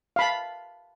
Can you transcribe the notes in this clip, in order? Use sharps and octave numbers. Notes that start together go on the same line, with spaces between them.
F5 A5 B5